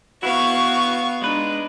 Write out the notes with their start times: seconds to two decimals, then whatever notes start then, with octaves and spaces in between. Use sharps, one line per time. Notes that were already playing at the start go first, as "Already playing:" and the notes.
0.23 B3 E4 F#4 F5 C#6
1.22 G#3 D4 D#4 B4